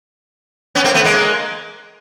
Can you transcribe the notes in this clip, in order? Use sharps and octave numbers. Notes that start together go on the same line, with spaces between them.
B3 C#4
A#3 C4
A3 B3
G#3 A#3